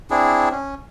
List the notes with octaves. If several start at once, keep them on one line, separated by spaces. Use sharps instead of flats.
C4 D4 E4 G#4
C#4